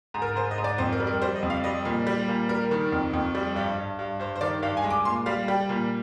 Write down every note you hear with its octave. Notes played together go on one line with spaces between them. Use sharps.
G#2
A#4
G#2 C5
D#5
G#2
D5
F2 C5
A#4
G3
A#4
G3 C5
D#5
F2
F5
G3 D#5
A#2
G3
A#2
G3 A#4
D#3
F2
F2
G3
G2
G2
G2
G2 C5
C5
D#3 D5
G2 F5
G#5
G#3
D6
A#2 C6
G3 F5
G3 G5
A#2